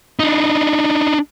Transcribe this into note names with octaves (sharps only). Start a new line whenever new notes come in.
D4 D#4